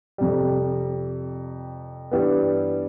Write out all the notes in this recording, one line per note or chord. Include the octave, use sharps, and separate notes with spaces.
F2 C3 G3
G2 E3 G3 B3